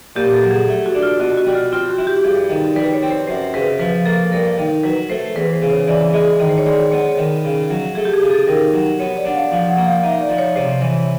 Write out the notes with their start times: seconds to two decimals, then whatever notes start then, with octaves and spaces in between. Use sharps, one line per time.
0.16 A#2 G4
0.34 A4
0.43 F#3
0.51 G#4
0.68 A3
0.86 F#4
0.95 D4
1.02 F4
1.20 B2 F#4
1.37 F#4
1.46 G3
1.55 F4
1.72 C4 F4
1.90 F#4
1.98 E4
2.07 G4
2.24 G2 G#4
2.49 D#3 A4
2.75 G3 B4
2.94 C#5
3.03 C4
3.11 C5
3.28 F#2 C5
3.54 C#3 B4
3.79 F3 B4
4.05 A#3 A4
4.32 G2 A#4
4.57 D#3
4.84 F#3 B4
5.10 A3 C5
5.35 E2 B4
5.53 C5
5.61 C#3
5.70 C#5
5.88 E3 D5
6.13 G#3 D#5
6.39 D#3 D#5
6.49 C5
6.58 C#5
6.66 G#3 D5
6.91 B3 C#5
7.17 D#3
7.44 C#3
7.70 F#3
7.95 A3 G#4
8.05 G4
8.13 G#4
8.21 C#3
8.31 A4
8.48 D#3 A#4
8.73 F#3
8.99 B3 C#5
9.17 D5
9.25 D4 F#5
9.35 F5
9.51 F3 F5
9.69 F#5
9.77 A#3
9.86 F5
10.03 D#4 E5
10.21 D5
10.29 F3
10.38 C#5
10.56 C3 C5
10.81 E3 C#5